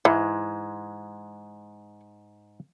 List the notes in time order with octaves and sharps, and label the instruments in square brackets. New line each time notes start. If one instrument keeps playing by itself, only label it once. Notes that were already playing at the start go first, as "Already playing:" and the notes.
[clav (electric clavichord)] G#2 G#3 [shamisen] E3